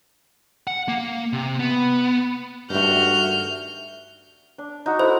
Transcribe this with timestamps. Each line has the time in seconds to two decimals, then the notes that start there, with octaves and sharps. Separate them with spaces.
0.67 F#5
0.88 A#3
1.33 C3
1.59 B3
2.70 G2 D#3 A3 F#4 F6 G6
4.58 D4
4.86 D#4 F#4
4.99 E4 A4 C5 E6